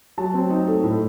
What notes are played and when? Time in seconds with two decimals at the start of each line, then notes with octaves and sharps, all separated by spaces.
0.18 F#3 A5
0.34 C4
0.50 D#4
0.67 A3
0.83 A2